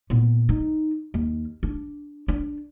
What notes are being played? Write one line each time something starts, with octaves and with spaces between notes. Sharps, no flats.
A#2 B3
D#4
D#2
D4
D4